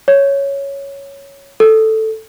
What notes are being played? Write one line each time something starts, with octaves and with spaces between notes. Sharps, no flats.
C#5
A4